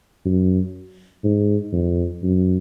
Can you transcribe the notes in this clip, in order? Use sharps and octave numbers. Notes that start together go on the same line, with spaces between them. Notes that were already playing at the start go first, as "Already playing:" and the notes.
F#2
G#2
F2
F#2